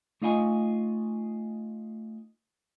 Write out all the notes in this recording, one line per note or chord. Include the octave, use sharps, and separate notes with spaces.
A3 D#4 F4 D#5 G5 G#5